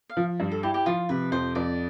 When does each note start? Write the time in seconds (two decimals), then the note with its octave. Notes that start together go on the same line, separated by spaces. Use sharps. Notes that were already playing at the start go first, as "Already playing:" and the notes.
0.09 F5
0.17 F3
0.40 G2
0.52 A4
0.63 E4 G4
0.74 G4
0.86 F3 F4
1.09 C3 B4
1.32 F2 C5
1.55 F2 D5